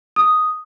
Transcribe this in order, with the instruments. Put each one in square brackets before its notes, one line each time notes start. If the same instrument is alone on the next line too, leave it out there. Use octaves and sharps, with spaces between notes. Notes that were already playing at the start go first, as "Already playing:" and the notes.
[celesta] D#6